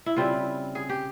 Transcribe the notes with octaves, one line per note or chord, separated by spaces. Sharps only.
E4
C#3 G3 C4 E4 F4
G#4
G4